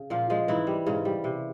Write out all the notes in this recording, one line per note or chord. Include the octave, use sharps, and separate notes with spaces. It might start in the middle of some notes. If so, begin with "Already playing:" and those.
Already playing: C#3
A#2 F3 F4
F3 G#3
G#2 E3 E4
G3
G#2 C#3 C#4
G3
C3